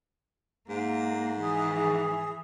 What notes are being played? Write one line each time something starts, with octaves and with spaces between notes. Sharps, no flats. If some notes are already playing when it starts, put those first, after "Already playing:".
G#2 A#3
E3 G#4